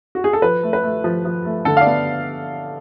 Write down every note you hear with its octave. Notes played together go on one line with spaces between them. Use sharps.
F#4
G#4
A4
F3 B4
A3
B4
A3
F3
F3
A3
D3 A4
F5
D5
B3